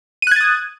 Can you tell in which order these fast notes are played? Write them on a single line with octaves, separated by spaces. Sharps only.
D#7 F#6 G#6 A6 D#6